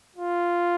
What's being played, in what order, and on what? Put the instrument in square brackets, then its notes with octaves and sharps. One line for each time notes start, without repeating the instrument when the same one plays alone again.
[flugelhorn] F4